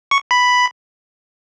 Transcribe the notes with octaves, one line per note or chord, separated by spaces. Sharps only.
C#6
B5